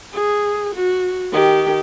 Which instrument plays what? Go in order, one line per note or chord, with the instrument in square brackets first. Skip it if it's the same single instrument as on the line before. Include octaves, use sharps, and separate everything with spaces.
[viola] G#4
F#4
D#3 G4